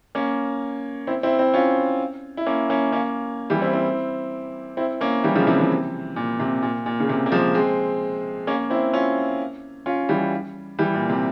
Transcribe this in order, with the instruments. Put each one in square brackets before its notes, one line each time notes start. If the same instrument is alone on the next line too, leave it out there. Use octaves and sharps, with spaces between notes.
[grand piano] A#3 C#4
C4 E4
C4 E4
C4 E4
C#4 F4
E4
A#3 C#4
A#3 C#4
A#3 C#4
E3 G3
C4 E4
C4 E4
C4 E4
A#3 C#4
E3 G3
C#3 F3
C3 E3
C3 E3
A#2
C3
A#2
A#2
C#3
C3
A#3
F3 G#3
G#3 C4
A#3 C#4
C4 E4
C#4 F4
C#4 F4
E3 G3
E3 G3
A#2
C3